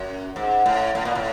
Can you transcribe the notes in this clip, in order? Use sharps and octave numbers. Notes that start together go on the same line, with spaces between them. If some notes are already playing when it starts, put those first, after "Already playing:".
Already playing: F#2
G#2
A2
A2
A#2
A2